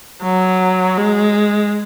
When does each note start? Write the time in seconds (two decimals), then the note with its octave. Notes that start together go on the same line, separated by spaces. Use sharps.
0.23 F#3
0.98 G#3